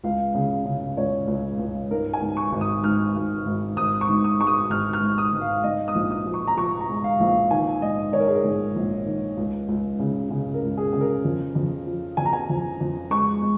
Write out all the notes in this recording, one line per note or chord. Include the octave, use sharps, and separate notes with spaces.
C#2 F5
C#3
C#3
C#2 C#5
C#2
C#2
G#2 A#4
G#5
G#2
C#6
G#1
D#6
G#2 F6
G#1
G#1
G#1 D#6
C#6
G#2
D#6
G#3 C#6
D#6
G#1 F6
F6
G#2
D#6
G#2
F5
G#2 D#5
D#6
A#1
D#6
F3
C#6
A#5
F3 C#6
A#5
G#3
F5
A#1
F5
D#3 G#5
G#2 D#5
D#3 C#5
A#4
G#4
A#4
G#2
A#1
D#3
C#2
C#2
C#3
C#3
A#4
C#2
G#4
C#3 G#4
A#4
F2
F2
F3
F2 G#5
A#5
G#5
F2
F2
G#3 C#6
G#3